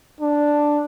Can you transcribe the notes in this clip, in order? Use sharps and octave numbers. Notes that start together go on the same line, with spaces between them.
D4